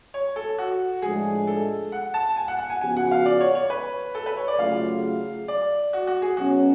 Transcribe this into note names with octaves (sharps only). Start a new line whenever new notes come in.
C#5
A4
F#4
A2 F3 G#3 D4 G#4
A4
F#5
A5
G#5
F#5
F#5
G#5
C#3 F3 B3 F#4 G#5
F#5
F5
D5
C#5
C#5
B4
A4
B4
C#5
D5
C#3 F#3 A3 F4 G#4 F5
D5
F#4
F#4
G#4
B2 F#3 C#4 F#4